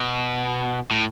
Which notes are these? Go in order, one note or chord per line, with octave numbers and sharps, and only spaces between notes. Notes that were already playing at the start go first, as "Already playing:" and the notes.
Already playing: B2
A2